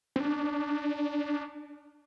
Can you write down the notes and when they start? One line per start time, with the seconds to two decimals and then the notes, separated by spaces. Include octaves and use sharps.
0.16 C4
0.20 D4